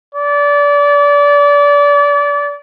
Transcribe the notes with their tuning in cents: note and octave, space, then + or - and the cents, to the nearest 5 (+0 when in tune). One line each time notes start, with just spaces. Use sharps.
D5 -30